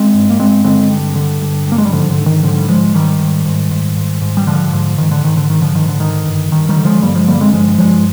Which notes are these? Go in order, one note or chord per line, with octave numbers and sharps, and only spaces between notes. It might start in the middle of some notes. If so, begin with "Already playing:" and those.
Already playing: G#3 C4
G2
A#3
G2 G#3 C4
D3 G#3 C4
G2
D3
G2
G2 A#3
G#3
G3
G#2 D3 F3
D3
G#2
D#3
G#2 D3 F3
G3
G#2 F3 G#3
G#2 D#3 G3
G#2
G#2
G#2
G#2
G#2
G3
G#2 D3 F3
G#2
G#2 D#3
D3
G#2 D#3
D3
G#2 D#3
D3 F3
G#2 D#3
D3
D3 D#3
G2
G2 D#3
D#3 G3
D3
F3 G#3
G2 G3 A#3
F3 G#3
D3 G3 A#3
G#3 C4
G2 F3 G#3
G2 F3 G#3